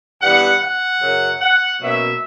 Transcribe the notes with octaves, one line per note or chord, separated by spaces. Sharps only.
G2 E3 B3 F#5
F#5
F#2 C#3 F#3
F#5
B2 F#3 A#3 C#4 E5